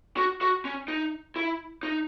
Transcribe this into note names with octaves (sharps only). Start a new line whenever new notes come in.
F#4
F#4
C#4
D#4
E4
D#4